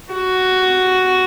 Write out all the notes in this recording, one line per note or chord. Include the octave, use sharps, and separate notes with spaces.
F#4